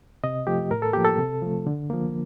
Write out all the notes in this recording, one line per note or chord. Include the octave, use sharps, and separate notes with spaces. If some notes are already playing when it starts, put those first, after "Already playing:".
C3 D#5
F3 A3 G4
A2 A#4
A4
F3 A#3 G4
A4
C3
F3 A3
D3
F3 A#3